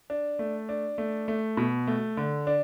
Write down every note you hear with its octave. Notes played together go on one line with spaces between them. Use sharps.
D4
A3
D4
A3
A3
B2
A3
D3
D4